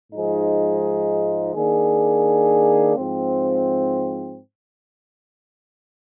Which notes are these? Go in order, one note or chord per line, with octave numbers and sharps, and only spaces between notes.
G#2 F3 G#3 D#4 G#4
D#3 A#3 D4 G#4
G#2 F3 C4